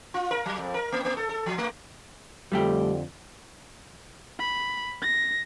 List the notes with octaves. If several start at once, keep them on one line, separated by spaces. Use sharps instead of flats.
F4
A#4
F#3
F2
A#4
A#3
A#3
A4
A4
F3
A3
F2 D3 G3 A3 G4
B5
A#6